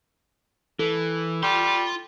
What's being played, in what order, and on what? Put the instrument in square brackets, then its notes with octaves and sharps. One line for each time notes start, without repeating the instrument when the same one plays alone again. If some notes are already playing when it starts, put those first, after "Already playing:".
[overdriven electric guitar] E3 [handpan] A4
[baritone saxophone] G3 [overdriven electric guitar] F4 C6